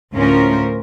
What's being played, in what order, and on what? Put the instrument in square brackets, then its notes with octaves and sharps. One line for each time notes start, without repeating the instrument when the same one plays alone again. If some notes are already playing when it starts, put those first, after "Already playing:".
[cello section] D2 A2 C#4 F4 A#4 C5